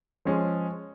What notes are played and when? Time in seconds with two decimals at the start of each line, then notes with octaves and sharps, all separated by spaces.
0.25 F3 G#3 C#4